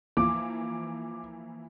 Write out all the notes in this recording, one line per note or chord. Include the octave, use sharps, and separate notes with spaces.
E3 F3 A#3 D6